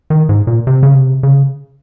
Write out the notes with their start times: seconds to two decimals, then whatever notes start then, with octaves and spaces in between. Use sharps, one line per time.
0.10 D#3
0.29 G#2
0.47 A#2
0.67 C3
0.83 C#3
0.95 C3
1.23 C#3